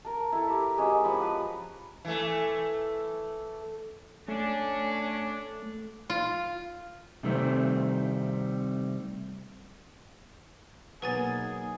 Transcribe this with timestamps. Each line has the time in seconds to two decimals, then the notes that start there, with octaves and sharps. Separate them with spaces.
0.05 A#4 A5
0.32 E4 A4
0.47 G4 A#4 E5
0.78 G#3 C#4 F#4 G4
1.04 F3 C#5 A5 B5
1.22 B4 A#5
2.05 E3 A3
4.28 A3 C#4 D4
6.10 F4
7.23 C3 D#3 G3 A3 C4
11.02 B2 F#3 A#3 D#4 G#4 B4 G#5 A6